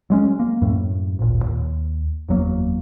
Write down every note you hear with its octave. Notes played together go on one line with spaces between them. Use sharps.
F#3 G#3 C#4
A#3
F#2 A2
D1 G#1 A#2
D#2
F#1 E2 F#3 A#3